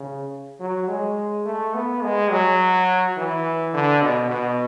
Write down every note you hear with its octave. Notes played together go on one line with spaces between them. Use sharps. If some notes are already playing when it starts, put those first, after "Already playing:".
Already playing: C#3
F#3
G#3
A3
B3
G#3
F#3
E3
D3
B2
B2